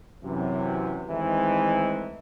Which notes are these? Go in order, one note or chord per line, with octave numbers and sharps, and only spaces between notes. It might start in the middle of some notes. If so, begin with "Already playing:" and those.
F#2 C3 E3
D#3 E3 G#3 A3 C4 D#4